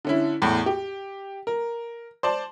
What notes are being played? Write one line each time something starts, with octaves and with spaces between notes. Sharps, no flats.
D3 C#4 E4
E2 A2
G4
A#4
C5 D5 A5